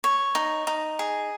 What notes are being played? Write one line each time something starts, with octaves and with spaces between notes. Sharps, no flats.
C#5
D#4
D#4
G#4